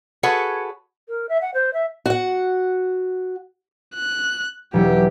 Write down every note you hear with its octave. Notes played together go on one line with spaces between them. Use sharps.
F#4 G#4 A4 B4 C#5 F#5
A#4
E5
F#5
C5
E5
F#4 F#5
F#6
E1 F#3 E4 G4